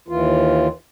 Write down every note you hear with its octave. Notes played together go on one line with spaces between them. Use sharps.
D#2 E3 F4